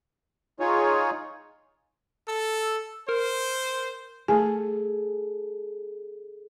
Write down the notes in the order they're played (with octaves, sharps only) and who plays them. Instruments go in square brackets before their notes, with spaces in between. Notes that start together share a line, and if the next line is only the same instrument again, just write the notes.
[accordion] D#4 F4 G#4 C#5
[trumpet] A4 [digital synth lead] E6
[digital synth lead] A#4 [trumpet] C5
[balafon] A3 G#5 [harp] G#4 A4